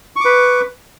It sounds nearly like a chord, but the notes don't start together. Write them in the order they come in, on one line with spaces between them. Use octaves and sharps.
C#6 D6 B4